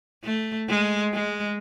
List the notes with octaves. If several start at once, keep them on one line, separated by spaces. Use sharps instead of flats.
A3
G#3
G#3